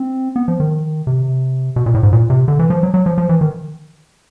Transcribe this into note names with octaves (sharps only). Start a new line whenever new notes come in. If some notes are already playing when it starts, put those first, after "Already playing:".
Already playing: C4
B3
F3
D#3
C3
B2
A#2
A2
G#2
A#2
C3
D3
E3
F3
F#3
F#3
F3
F3
E3
D#3